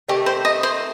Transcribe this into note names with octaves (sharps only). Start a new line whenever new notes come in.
C3 D#3 A3 G4
C5
D#5
C5